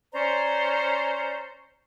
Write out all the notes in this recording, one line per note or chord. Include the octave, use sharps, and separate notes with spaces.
C#4 C5 D5 A#5